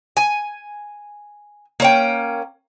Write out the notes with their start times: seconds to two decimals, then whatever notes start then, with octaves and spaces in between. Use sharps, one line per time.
0.17 G#5
1.80 A#3 C#4 G5